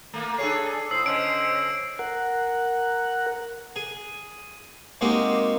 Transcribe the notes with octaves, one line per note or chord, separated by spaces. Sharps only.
A3 A#3
D4 G#4 A4 C#5 G#5 C7
A2 C5 D#6 E6 C7
D3 C#4 C5 D#5 D7
A#4 F#5
G#4
G#3 A#3 C4 D#4 F#4 G4